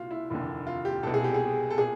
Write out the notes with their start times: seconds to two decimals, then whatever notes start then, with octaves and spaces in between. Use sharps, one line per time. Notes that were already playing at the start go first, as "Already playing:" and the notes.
Already playing: C2 A#2 F4 F#4
0.11 E4
0.30 F1 D#2 D3
0.67 F4
0.85 G4
1.03 C2 B2 A4
1.14 G#4
1.24 G4
1.34 G#4
1.70 A4
1.78 A#2 G#4